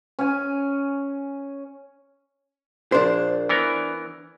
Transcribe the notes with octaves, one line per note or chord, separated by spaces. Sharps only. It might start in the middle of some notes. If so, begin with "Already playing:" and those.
C#4 G#5
A#1 D4 C5
E3 B3 A#4